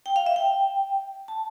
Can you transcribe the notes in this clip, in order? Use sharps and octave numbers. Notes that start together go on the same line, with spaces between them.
G5
F5
E5
G5
A5